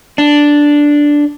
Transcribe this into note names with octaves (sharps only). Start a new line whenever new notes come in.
D4